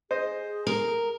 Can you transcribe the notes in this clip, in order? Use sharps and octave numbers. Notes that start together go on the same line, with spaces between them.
G#4 C5 D#5
A#4